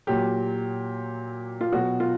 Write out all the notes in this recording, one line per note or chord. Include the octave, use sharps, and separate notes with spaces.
A#2 F#3 G4
F4
B2 F#3 F#4
F4